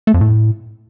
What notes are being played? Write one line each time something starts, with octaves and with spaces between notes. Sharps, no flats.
A3
F2
A2